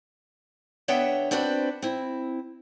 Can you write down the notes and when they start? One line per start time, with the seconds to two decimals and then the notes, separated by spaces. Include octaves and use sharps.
0.88 D3 B3 C#5 E5 F#5 G5
1.31 C4 D4 F#4 B4 C5
1.82 C4 E4